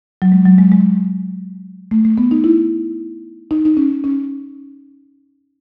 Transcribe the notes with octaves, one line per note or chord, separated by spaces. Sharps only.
F#3
G#3
F#3
G#3
G#3
A3
A3
B3
D#4
E4
D#4
D#4
C#4
C#4